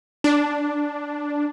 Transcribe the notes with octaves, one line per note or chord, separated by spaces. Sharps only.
D4